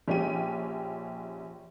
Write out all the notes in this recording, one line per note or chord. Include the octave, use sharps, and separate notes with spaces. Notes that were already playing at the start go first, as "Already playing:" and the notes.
A#1 C#4 G4 D#7